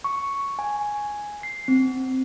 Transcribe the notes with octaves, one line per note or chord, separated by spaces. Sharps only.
C#6
G#5
C7
C4